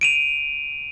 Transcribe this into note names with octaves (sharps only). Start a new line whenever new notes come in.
D7 D#7 F7